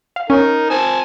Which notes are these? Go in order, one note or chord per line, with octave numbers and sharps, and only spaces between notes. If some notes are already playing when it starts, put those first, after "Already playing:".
F5
C#4 D#4 A#4
C4 G#5 A5